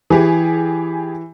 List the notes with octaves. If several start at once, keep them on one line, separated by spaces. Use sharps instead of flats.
E3 G4 G#4